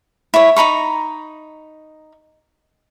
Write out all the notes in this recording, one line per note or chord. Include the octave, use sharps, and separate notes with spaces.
E4 C#5
D#4 A#5 B5 C#6